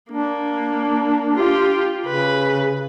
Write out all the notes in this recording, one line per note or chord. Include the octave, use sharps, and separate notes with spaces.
A#3 D4
F4 G4
C#3 B4